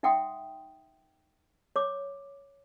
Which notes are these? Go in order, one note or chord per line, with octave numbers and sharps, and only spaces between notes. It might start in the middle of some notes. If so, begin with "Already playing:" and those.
D#4 E5 F#5 G5 C6 D#6
C#5 D6